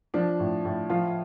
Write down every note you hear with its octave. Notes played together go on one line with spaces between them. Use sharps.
F3 D4
A2
A2
F3 F4